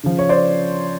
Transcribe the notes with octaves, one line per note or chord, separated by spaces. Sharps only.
C#3 F3
C#5
C5 D5